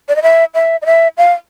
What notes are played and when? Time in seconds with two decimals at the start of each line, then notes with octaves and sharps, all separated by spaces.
0.09 D5
0.16 D#5
0.23 E5
0.54 E5
0.82 D#5
0.86 E5
1.17 F5